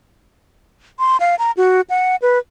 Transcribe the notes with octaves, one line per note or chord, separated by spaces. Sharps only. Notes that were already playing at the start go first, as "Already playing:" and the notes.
C6
F5
A#5
F#4
F#5
B4